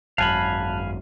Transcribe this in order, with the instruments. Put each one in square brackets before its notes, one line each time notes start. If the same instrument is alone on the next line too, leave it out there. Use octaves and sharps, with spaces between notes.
[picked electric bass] G#1 F#2 [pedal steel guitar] F5 G#5 B5 [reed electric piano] A5 F6 F#6